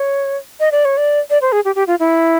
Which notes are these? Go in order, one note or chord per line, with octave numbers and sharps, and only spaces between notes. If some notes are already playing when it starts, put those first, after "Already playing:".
Already playing: C#5
D#5
D5
C#5
D5
D5
C5
G#4
G4
G4
F4
E4